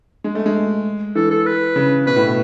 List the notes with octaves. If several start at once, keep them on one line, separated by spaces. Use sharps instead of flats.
G#3
A3
G#3
E3 A4
A4
B4
C#3
B2 B4
A2
B2